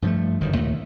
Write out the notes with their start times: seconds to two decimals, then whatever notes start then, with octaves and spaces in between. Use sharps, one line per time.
0.02 G2 F3 G#3 A3
0.41 G1 F#2 D#3
0.54 D#2 A#2 A3